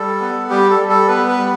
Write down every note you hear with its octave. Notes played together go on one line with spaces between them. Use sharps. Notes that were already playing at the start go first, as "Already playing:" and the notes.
Already playing: G3 A4
B3
G3 G4
A4
G3
A4
B3 B4
B4
G3